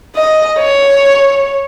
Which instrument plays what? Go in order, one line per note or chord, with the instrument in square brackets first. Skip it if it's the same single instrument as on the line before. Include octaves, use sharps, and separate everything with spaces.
[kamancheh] D#5
C#5